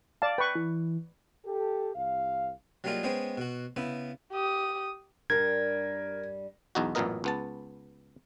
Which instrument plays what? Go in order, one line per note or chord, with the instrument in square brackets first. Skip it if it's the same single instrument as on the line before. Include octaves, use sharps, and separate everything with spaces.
[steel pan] D5 A5 [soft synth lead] F5
[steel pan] B4 C#6 [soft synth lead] G5
[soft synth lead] E3
[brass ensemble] G4 A4
C2 F5
[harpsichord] F#3 G3 A#3 D#4 F4 G#4
G#3 B3 C#4 G#4 C5 G5
B2 F#4
C#3 B3 E4
[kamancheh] G4 D#6
[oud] G2 G3 D4 [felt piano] A#4 [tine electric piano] G#6
[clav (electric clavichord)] B1 E2 D#4 F#4
A1 F#2 A#2 B3 A#4 D#5
C#2 B3 A5